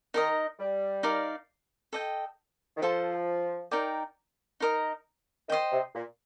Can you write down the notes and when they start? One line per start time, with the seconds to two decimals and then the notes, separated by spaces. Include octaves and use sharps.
0.14 D#3 D#4 A#4 D#5
0.60 G3
1.03 D#4 A#4 D5 F5
1.93 A4 D#5 G5
2.77 D#3
2.82 F3 F4 A4 C5
3.71 D#4 A#4 D5 G5
4.60 D#4 A#4 D#5
5.49 D#3 C5 D#5 G5
5.72 C3
5.95 A#2